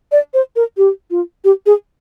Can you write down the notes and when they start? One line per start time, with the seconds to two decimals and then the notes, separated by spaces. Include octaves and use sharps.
0.12 D5
0.34 C5
0.56 A#4
0.77 G4
1.11 F4
1.44 G4
1.66 G#4